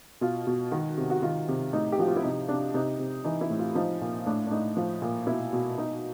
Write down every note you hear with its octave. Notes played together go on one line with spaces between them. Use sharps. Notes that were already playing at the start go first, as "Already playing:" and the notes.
B2 F4
B2
D#3 F#4
C3
F#4
D#3 F4
C3
A2 D#4
G4
F3 F#4
F4
E4
C3 D#4
C3 D4
C3 D#4
C3
E3 D#4
E4
A2
F4
F3 D#4
A#2
A2 D4
D4
A2 D#4
F3
A#2
B2 E4
B2
B2 D#4